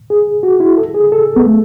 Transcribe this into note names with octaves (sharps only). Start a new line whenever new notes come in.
G#4
F#4
E4
A4
G#4
A4
B3
A3